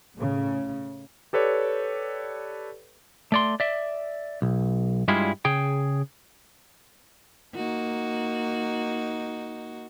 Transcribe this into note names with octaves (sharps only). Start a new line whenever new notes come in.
A2 C#3
G4 A4 B4 C#5 D5
A3 D5 C6
D5 E5
B1
G2 G3 G#3 E4 F4 G#4
C#3 G#4 G5
A#3 D#4 F#4